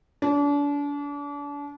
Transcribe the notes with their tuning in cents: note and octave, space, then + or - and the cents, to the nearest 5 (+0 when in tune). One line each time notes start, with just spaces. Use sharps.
D4 -35 F4 +0